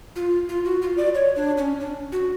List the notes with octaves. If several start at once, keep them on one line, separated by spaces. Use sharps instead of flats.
F4
F4
F#4
F4
D5
C#5
D4
C#4
D4
F#4